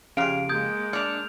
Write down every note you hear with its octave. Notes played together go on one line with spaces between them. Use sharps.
F2 C#3 G4 G#4 F5 D7
G#3 A#3 D#6 G6 G#6
D4 D5 D6 F6 C#7 F7